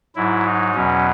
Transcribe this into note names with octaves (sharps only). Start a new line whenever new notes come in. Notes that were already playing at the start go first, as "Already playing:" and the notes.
G#2 F#3 E4
D#4
E2 B2 F#3 C#4